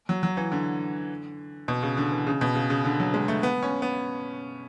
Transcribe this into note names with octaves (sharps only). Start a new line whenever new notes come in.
F#3
F#3
E3
D3
B2
C#3
D3
E3
C#3
B2
C#3
C#3
D3
F#3
G#3
A3
B3
C#4
B3